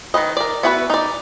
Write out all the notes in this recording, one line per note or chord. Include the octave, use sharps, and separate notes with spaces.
D#3 A#3 B4 D#5
A#4 D5
B3 E4 F#4 A4 B4
D#4 D5